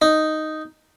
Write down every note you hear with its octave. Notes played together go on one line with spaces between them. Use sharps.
D#4